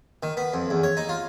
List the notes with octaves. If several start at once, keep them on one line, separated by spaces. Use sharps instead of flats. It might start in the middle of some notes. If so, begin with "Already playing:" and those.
D#3
B3
F2
E2
C#5
D#4
F4